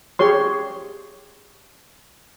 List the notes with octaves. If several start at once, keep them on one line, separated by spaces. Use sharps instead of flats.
G4 G#4 C#5 C6